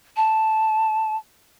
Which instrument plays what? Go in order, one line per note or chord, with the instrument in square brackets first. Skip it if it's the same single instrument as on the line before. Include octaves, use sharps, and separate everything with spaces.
[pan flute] A5